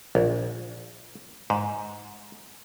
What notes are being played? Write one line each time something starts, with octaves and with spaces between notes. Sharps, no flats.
A#1
G#2